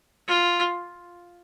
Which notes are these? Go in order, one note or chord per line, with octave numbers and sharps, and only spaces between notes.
F4